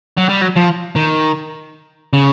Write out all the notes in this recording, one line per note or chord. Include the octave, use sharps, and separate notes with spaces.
F#3
G3
F#3
F3
D#3
C#3